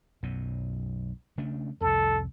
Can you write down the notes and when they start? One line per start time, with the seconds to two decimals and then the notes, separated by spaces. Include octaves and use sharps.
0.23 B1 F#2 B2
1.38 C#3 A3 D4
1.81 C2 F2 A4